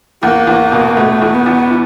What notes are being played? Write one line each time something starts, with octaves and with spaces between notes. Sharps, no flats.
E2 A#3
E2
B2
B2 A3
E2
B3
E2
E3